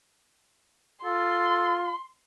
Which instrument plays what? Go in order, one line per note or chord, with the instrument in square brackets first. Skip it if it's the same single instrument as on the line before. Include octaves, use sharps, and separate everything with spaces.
[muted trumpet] F4 [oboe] A4 [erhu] C6